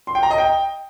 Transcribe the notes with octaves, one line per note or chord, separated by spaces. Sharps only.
C6
G5
A#5
D#5
G5